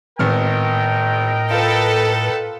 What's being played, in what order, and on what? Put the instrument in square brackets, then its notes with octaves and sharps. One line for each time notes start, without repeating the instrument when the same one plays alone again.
[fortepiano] G#1 B3 F6 [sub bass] A2 [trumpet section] A#4 D#5 G5
[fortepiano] F4 [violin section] A4 B4